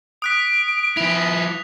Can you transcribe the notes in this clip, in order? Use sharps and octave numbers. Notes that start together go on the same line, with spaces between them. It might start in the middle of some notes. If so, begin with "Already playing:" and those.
D#6 F#6 B6 D7
F3 E4 F7